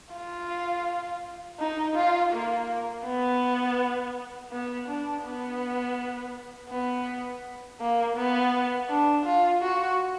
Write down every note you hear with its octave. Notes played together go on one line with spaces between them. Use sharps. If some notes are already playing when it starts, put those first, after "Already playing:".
F4
D#4
F4
A#3
B3
B3
D4
B3
B3
A#3
B3
D4
F4
F#4